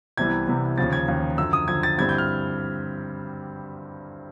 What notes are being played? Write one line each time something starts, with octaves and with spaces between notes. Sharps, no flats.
C2 C3 E3 G3 B3 G#6
C2 C3 E3 G3 B3
D#2 C#3 F3 A6
G#6
D#2 C#3 F3
F#2 D3 F3 E6
D#6
F#2 D3 F3 G#6
A6
G2 D3 G3 C4 E4 G#6
G6
F6